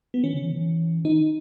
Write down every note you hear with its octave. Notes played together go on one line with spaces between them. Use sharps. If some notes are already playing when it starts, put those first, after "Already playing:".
B3
D#3 C#4
C#3
E3
E3
D#3 D#4